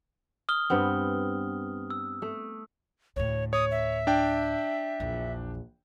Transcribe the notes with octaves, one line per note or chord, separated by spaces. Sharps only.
D#6 F6 G7
G2 B3 C4
E6
A3
D2 A2 C#5
C#5 D#6
E5
D4 G5
A#1 E2